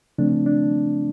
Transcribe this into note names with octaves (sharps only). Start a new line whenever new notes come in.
C#3 F3 A3 C4 D4
D4